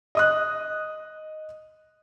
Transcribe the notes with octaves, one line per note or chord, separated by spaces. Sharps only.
D#5 D#6 F#6